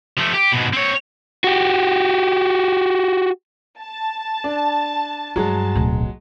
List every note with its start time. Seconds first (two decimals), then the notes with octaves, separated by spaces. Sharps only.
0.18 F3 A3
0.34 G4
0.53 G#2 B2
0.73 C4 C#5
1.44 F#4 G4
3.80 A5
4.44 D4
5.36 G2 F#3 G#3
5.75 D1 B1